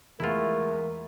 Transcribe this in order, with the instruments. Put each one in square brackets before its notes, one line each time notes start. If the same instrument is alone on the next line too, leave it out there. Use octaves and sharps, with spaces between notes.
[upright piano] E2 G#3 B3 [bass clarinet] A3 [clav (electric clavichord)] E4 F4 [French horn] A#4